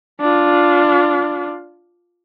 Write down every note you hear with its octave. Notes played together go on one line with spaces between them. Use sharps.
D4 F4